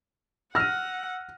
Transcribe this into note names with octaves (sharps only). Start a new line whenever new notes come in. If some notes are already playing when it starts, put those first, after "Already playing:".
F#5 E6 F6 A#6 D#7